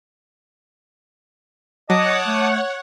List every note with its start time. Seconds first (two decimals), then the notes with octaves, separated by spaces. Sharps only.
1.90 F#3 C#5 D#5 F#5 A5 D6 D#6
2.27 A3